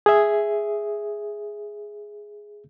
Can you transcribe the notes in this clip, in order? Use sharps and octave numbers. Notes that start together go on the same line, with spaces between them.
G#4 E5